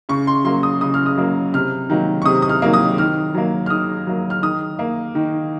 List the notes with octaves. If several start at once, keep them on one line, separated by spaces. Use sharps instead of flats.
C#3 C#6
C6
F#3 A#3 C6
D#6
C#3 D#6
F6
D#6
F#3 A#3
C3 F6
D#3 F#3 A#3
C#6
C3 D#6
D#6
F6
D#3 F#3 A#3
D#6
D#3 F6
F#3 A#3
F6
D#3 D#6
F#3 A#3
F6
D#3 D#6
A#3
D#3